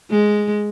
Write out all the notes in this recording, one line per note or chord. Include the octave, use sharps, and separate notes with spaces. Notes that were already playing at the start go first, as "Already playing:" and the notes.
G#3